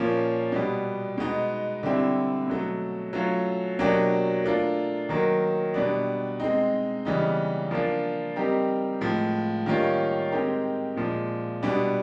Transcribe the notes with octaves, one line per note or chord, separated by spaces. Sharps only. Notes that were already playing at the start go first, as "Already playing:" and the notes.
Already playing: A#2 F3 A#3 C#4 F4
B2 G3 B3
B2 G#3 B3 D#4
D3 G3 C4 E4
B2 F#3 A3
F#3 A3 C#4 F4
B2 F#3 A#3 D4 G4
A3 D4 F4 A#4
D#3 F#3 A#3
B2 G3 B3 D4
G#3 C4 D#4
C#3 E3 G3 B3 D#4
F3 A#3 D4 F4
G3 C4 D#4 G4 A#4
A2 F3 G#3
D#3 G3 A#3 C#4 F4
G#3 C4 D#4 G4 A#4
A#2 F3 G#3
B2 G3 B3 D4